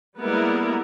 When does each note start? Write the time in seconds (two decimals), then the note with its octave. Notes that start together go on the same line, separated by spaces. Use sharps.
0.19 G3 G#3 A#3 B3 E4 A#4